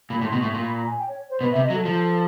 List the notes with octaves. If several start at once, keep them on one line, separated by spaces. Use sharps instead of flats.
A#2 B5
A2
C6
B2
A2 C#6
A#2 C6
B5
A#5
G#5
G5
C#5
C5
B2 B4
C3 E5
D#5
F#3
A4
F3